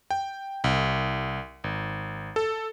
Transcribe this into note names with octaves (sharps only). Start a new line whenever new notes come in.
G5
C2
G#1
A4